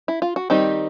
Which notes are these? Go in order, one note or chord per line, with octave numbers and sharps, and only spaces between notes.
E4
F4
F#4
D#3 G3 C4 D#4 G4